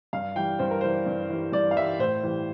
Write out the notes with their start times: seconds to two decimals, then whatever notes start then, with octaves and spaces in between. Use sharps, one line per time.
0.13 G2 F5
0.36 E3 G3 G5
0.59 G2 C5
0.71 A#4
0.81 E3 G3 C5
1.06 G2
1.30 E3 G3
1.52 G2 D5
1.71 F5
1.77 E3 G3 E5
1.99 A2 C5
2.23 E3 G3